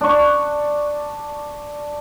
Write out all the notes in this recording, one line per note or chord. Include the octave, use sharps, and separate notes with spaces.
D4 C#6